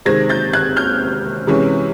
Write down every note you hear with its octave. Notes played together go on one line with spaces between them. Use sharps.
C3 D#3 G#3 C4 G#6 A#6
G6 A6
F#6 G#6
F6 G6
C3 E3 G#3 C#4